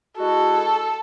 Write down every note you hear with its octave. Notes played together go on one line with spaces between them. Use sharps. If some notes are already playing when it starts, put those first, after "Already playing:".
G#3 E4 F#4 A4